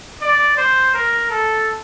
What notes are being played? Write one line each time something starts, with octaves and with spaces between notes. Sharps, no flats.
D5
C5
A#4
A4